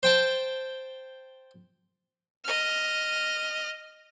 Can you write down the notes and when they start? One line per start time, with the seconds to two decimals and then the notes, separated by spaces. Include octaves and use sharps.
0.03 C5 G5 A5
2.44 D#5 F6